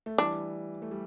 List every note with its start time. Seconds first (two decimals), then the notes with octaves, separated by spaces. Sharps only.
0.06 A3
0.18 E3 G3 D4
0.82 A3
0.91 G3